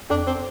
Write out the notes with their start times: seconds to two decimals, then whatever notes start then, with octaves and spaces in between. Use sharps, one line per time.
0.10 F2 D4
0.27 C4